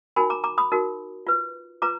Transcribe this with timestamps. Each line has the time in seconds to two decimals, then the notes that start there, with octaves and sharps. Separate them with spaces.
0.16 D#4 F#4 A#4 G#5 B5
0.30 A#5 D6
0.44 A#5 D6
0.58 B5 D#6
0.72 D#4 F#4 A#4
1.27 F4 B4
1.82 F4 B4 A#5 D6